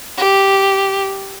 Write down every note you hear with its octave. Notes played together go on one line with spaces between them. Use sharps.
G4